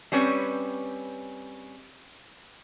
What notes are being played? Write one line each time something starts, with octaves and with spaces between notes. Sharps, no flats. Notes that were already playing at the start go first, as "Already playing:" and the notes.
G3 C4 C#4 B4 C#5